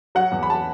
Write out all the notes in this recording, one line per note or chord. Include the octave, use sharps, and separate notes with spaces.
F#3 F#5
E2
B5
F#3 A5